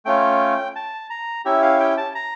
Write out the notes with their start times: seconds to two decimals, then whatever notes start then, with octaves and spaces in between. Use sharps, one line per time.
0.06 A3 C#4 F4 G5
0.76 A5
1.10 A#5
1.45 C#4 E4 G4 E5
1.62 F5
1.80 G5
1.98 A5
2.15 A#5